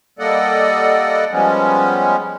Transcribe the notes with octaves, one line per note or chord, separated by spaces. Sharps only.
G3 A#3 A4 D5 D#5 F#5
F3 G3 G#3 B3 C#4